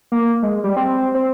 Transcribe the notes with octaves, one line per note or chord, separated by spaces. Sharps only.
A#3
G#3
G3
C4
C4